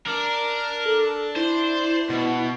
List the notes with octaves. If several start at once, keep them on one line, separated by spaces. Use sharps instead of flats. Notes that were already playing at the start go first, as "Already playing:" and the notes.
D4 A#4
A4
E4 C5
B2